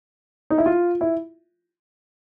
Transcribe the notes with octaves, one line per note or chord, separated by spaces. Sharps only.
D#4
E4
F4
E4